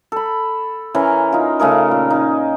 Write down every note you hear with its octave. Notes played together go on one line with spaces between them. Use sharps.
A4 B5
E3 C#4 A#4
D#4 F4
C#3 A3 G#4 A#4
A#2
D#4